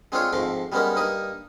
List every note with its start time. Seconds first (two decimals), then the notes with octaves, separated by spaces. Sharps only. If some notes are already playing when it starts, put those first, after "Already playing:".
0.12 G#3 C4 D4 F4 A4 C#5
0.33 F2 G#2 A3 C6 D6
0.72 G3 G#3 A#3 B3 C#4 D#4
0.96 G2 A#3 D#4 D#6